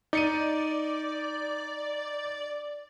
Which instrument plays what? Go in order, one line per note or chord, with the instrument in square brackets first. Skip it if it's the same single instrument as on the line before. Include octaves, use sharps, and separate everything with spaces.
[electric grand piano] D#4 C#7 D#7 [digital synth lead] D5